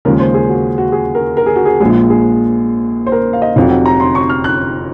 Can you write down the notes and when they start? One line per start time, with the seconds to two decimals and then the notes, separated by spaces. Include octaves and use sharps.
0.05 D#2 C#3 F3 G#3 A#4
0.20 C5
0.34 G#4
0.49 F#4
0.78 F#4
0.92 G#4
1.15 A#4
1.37 A#4
1.46 G#4
1.56 F#4
1.65 G#4
1.80 A#1 A#2 F3 G#3 G#4
2.10 G#4
3.07 C5
3.12 A#4
3.33 F5
3.42 D#5
3.56 F1 F2 C3 F#3 F5
3.71 F#5
3.86 A#5
4.00 C6
4.15 C#6
4.29 F6
4.44 F#6